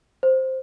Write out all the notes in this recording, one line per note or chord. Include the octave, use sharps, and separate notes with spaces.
C5